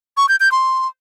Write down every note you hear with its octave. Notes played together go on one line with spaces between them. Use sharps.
C#6
G6
G6
C6